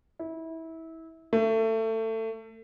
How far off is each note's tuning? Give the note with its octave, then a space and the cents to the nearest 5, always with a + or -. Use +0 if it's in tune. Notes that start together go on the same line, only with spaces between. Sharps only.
E4 -25
A3 +25